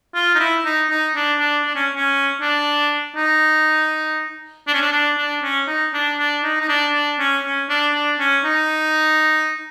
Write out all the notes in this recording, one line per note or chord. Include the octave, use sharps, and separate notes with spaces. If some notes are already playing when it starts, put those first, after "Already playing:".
F4
D#4
E4
D#4
D#4
D4
D4
D4
C#4
C#4
D4
D#4
D4
C#4
D4
D4
D4
C#4
D#4
D4
D4
D#4
D#4
D4
D4
C#4
C#4
D4
D4
C#4
D#4